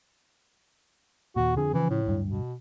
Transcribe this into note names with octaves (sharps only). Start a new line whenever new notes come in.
D#2 A#2 F#4
F2 D3 F3 G#4
C#3 E3 F3
A2
D1 G2
B2